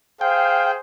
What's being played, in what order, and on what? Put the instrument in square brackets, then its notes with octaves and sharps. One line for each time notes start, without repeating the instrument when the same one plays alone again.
[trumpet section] G#4 C5 [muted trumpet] F5 [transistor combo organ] G5